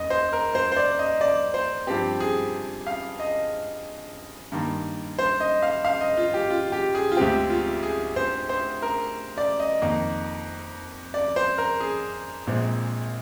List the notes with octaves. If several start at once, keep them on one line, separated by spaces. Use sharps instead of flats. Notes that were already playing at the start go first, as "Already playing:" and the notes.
Already playing: F1 D#2 D#5
C5
A#4
C5
C5
D5
D#5
D5
C5
G2 F3 C4 G4
G#4
F5
D#5
G2 D#3 A#3
C5
D#5
F5
F5
D#5
F4
G4
F4
G4
G#4
F4
D2 D3 G#3 C4 G4
F4
G#4
C5
C5
A#4
D5
D#5
F2 D#3 A#3
D5
C5
A#4
G#4
A#1 A#2 G#3 C4